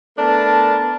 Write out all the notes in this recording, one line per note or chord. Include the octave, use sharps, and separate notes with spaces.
A3 B3 D4 A#4 A5